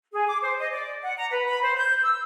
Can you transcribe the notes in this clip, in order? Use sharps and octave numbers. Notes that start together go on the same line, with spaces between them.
G#4
D6
C5
D#5
D5
F#5
A#5
B4
B5
C5
G6
E6